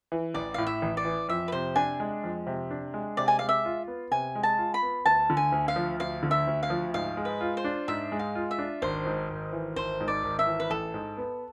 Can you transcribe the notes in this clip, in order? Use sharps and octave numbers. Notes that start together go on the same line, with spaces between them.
E3
A1 D5
A2 F5
E5
A1
D5
E3
F2 E5
B4
C3 C5
D4 G#5
G#3
F2
C3
D4
G#3
C3 D5
G#5
G#3 F5
E5
F4
B3
C3 G#5
G#3
A5
F4
B5
B3
D2 A5
D3
G#5
D2
F5
F3
D2 F5
D3
E5
D2
F5
F3
G#2 F5
G#3
B4
F4
C5
D4
G#2 E5
G#3
F5
F4
E5
D4
G#1 C5
G#2
G#1
E3
G#1 C5
G#2
D5
G#1
E5
E3
B4
A1 A4
G#2
B3